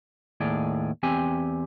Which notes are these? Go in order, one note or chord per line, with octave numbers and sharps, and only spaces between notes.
D#2 A2 G#4 D5
E2 C4 G4 G#5